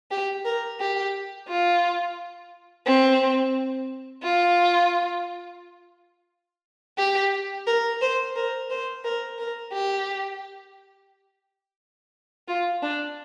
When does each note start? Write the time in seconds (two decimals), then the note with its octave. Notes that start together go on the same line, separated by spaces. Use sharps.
0.11 G4
0.45 A#4
0.80 G4
1.48 F4
2.86 C4
4.23 F4
6.98 G4
7.67 A#4
8.01 C5
8.36 A#4
8.70 C5
9.04 A#4
9.39 A#4
9.73 G4
12.48 F4
12.83 D4